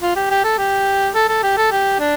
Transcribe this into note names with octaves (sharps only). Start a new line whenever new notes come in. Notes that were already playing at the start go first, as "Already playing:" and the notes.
F4
G4
G4
A4
G4
A4
A4
G4
A4
G4
D4